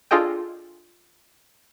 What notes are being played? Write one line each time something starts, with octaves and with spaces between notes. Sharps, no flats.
D4 F4 G#4 A4 D#5 G5